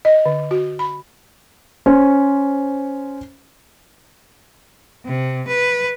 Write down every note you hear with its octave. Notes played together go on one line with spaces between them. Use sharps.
D#5
D3
F#4
B5
C#4 C5
C3
B4